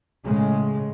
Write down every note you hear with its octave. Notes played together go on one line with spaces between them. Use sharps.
A2 C#3 G#3